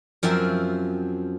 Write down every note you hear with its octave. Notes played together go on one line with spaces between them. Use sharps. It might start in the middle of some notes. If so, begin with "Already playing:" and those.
F#2 F3 C4 E5